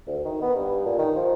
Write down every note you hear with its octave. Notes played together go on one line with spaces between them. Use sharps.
D2
D#3
B3
G2
A#2
D#3
F3